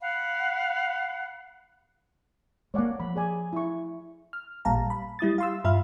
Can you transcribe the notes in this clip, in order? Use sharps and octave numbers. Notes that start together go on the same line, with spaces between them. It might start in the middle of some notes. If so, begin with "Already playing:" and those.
F5 F#5 B5
G#3 A#3 C#5 D5 F#5
F3 B5
G#4 D5 G#5
E4 C#6
F6
A1 A#2 G3 F5 A5 A#5
B5
G3 E4 D#6 A6
F5 C6 E6
G2 F4 E5 B5 F6